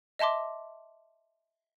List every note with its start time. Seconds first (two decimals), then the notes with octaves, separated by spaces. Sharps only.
0.19 D#5 E5 A5 C6 D6